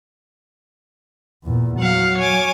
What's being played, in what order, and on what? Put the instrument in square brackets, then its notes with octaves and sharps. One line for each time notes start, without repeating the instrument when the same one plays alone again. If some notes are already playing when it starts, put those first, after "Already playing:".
[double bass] E2 A#2
[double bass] F#3 [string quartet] F5 F#5
[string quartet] C#5 G#5 D6